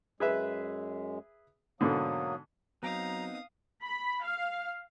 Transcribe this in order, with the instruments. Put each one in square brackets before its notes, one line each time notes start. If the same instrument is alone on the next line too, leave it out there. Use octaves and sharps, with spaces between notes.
[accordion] F#2 G#3 [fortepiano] G#4 B4 E5
[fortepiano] G#2 B2 D3 [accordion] F#3 A#3 D#6
[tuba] F#3 [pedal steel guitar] B3 C4 D#4 [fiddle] F5 D#6 [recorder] A#5
[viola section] B5
F5